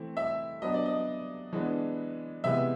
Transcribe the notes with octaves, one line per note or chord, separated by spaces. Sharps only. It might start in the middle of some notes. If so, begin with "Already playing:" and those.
Already playing: E3 A3 C4 E4
E5
F#3 B3 D4 D#5
D5
D#5
E3 G#3 B3 D4
C3 E3 G#3 B3 E5